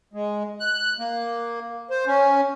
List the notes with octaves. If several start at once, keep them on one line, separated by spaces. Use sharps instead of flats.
G#3
F#6
A#3
C5
C#4